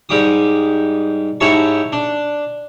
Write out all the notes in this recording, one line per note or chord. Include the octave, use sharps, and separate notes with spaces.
G#2 G3 G4 D6 D#6
G#2 E4 G4 C#5 A5 C#6
D4